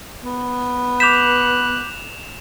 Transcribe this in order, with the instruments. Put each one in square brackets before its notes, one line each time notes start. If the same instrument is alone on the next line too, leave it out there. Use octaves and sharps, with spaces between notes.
[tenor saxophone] B3
[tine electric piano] D6 G6 B6 [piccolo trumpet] F#6 [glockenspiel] E7 F7